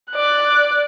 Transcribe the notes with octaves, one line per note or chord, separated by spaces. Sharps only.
D5 F#6